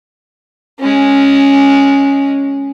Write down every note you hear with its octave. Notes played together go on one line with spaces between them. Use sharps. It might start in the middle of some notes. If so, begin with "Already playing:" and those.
G#3 C#4